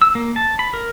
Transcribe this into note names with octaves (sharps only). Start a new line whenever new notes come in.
E6
A#3
A5
B5
A#4